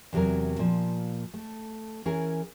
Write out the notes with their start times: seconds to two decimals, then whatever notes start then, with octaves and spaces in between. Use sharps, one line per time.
0.13 E2 C3 E3 F#3 A#4
0.59 A#2 F3
1.34 A3
2.05 E3 C#4 G#4 A#4